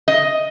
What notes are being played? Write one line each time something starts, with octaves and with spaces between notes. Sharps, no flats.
D#5